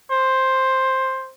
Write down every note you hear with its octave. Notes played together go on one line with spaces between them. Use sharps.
C5